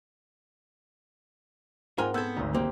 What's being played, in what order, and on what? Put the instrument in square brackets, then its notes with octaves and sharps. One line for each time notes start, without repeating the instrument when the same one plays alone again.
[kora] G#2 C4 [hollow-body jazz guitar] F4 G#5 [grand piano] A#4 F#5 A#5
[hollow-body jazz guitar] B3 A4 [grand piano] E6 G6 G#6
[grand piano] G#1 D2 [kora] D#4
[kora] C3 C4 G4 [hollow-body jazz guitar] A#3